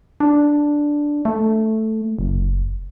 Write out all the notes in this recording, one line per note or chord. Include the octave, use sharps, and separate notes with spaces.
D4
A3
F#1